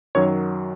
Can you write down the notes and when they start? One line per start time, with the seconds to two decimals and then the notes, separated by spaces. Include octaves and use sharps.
0.15 F#2 D#3 F#3 C#5